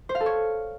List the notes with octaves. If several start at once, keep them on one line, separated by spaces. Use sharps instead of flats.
C5
F5
A4
C#5